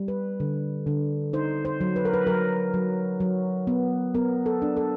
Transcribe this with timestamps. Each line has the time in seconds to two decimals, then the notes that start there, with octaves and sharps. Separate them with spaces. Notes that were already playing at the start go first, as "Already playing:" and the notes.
Already playing: G3
0.08 B4
0.40 D3
0.87 D3
1.33 D#4 C5
1.65 C5
1.81 F#3
1.96 B4
2.05 A#4
2.13 B4
2.27 F#3 A#4
2.74 F#3
3.20 F#3
3.67 B3
4.14 B3 A#4
4.46 A4
4.62 D4
4.77 A4